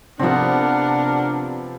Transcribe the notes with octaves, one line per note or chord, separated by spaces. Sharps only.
C3 F3 B3 C4 D4 A#4 F#5